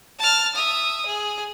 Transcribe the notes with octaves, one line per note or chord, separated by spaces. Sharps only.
A5 F6
E5 D#6
G#4